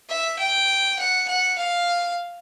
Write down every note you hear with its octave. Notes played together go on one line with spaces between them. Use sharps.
E5
G5
F#5
F#5
F5